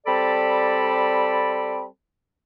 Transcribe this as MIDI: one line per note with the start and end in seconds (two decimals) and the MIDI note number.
0.07 1.85 55
0.07 1.85 60
0.07 1.85 69
0.07 1.85 74
0.07 1.85 81
0.07 1.85 83